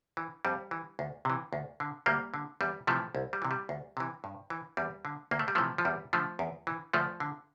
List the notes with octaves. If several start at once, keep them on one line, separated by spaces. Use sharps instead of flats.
E3
F2 G3
E3
D2
C3 E3
D2
D3
D2 G3 A#3
D3
E2 G3
C3 E3 F3 A3
C2
G3
C3 E3
G3
D2
C3 E3
G2
E3
E2 G3
D3
D2 A#3
A3
G3
C3 E3 F3 A3
F3
E2 G3
D3 F3 A3
E2
E3
D2 F3 A3
D3